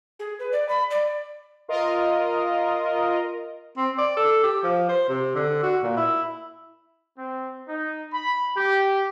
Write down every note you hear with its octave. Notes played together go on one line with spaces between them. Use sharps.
G#4
B4
D5
B5
D5
F4 A#4 D#5
C4
D5
A4
G4
F3
C5
C3
D3
F#4
A#2
E4
C4
D#4
B5
G4